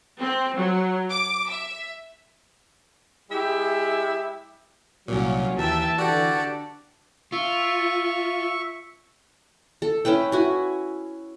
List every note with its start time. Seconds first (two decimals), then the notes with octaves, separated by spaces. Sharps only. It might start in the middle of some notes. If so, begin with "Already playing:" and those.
0.19 C4
0.57 F#3
1.11 D6
1.50 E5
3.31 G#3 E4 G4 G#4 E5
5.08 C2 A#2 F#3 A#3 C#4 F4
5.58 D#2 E3 E5 G5 A5
5.98 D3 F#4 G4 A4 D5
7.32 F4 E5 C#6
9.82 A4
10.05 C#4 E4 B4 G5
10.32 E4 F#4 G#5